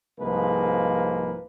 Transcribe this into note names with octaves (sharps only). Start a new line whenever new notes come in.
C2 G#2 F3 G#3 A#3 B4